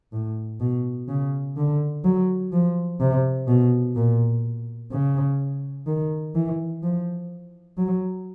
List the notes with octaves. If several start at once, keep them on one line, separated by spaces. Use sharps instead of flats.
A2
B2
C#3
D3
F#3
F3
C3
B2
A#2
C#3
D#3
E3
F3
F#3